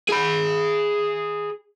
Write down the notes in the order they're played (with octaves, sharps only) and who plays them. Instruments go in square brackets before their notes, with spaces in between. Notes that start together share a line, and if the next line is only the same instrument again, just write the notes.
[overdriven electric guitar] G#4 B5